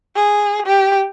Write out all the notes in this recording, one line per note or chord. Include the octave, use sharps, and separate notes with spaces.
G#4
G4